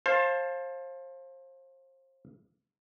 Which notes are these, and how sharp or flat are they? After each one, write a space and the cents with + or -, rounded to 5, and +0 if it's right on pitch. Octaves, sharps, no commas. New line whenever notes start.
C5 +30 F5 +0 A5 +0